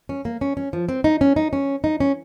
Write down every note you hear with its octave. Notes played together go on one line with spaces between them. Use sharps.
C#4
A#3
C#4
C#4
F3
C4
D#4
C#4
D#4
C#4
D#4
C#4